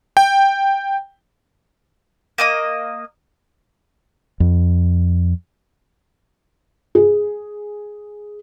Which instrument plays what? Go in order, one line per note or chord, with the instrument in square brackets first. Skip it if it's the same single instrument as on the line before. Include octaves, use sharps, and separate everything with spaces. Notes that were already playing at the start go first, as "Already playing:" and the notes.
[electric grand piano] G5
[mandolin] A#3 D#5 D#6
[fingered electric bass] F2
[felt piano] G#4